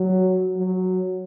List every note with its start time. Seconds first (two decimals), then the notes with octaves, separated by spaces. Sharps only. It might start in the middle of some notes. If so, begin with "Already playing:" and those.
Already playing: F#3
0.57 F#3